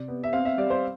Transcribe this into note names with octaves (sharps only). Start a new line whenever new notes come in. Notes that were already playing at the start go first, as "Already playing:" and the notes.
Already playing: C3 D5
B3
E5
C4 F5
E5
G3 D5
C5